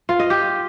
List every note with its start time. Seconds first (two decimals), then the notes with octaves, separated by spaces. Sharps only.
0.09 F4
0.19 D#5
0.30 G4